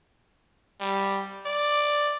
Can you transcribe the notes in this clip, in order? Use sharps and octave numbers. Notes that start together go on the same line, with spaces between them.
G3
D5